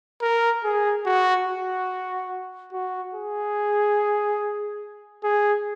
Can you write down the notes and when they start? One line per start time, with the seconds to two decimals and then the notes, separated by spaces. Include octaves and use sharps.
0.22 A#4
0.64 G#4
1.06 F#4
1.47 F#4
2.73 F#4
3.14 G#4
5.24 G#4